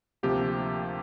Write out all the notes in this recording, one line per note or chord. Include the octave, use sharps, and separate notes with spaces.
D2 C3 F3 A#3 G4